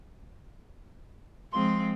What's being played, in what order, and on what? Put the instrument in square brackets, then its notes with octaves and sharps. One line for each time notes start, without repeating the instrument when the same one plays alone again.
[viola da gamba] F3 G#3 C4 [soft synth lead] C6